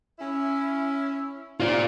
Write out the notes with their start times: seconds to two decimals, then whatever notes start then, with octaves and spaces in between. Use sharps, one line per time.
0.19 C#4 E4
1.60 C3 F4 D5